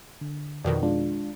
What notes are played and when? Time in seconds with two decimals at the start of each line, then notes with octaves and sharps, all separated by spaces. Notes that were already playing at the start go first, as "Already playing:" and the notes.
0.21 D3
0.65 F2 B2 D#3 D5
0.83 G#3 D4 F4